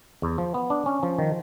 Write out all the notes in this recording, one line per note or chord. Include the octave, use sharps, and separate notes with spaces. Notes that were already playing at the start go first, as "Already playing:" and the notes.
E2
F3
B3
D4
C#4
F3
D#3